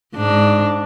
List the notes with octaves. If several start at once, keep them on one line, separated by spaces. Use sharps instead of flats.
G#2 D4